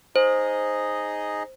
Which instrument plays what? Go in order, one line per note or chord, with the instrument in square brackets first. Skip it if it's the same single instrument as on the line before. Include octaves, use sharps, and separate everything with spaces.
[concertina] D#4 G#4 D#5 [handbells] C5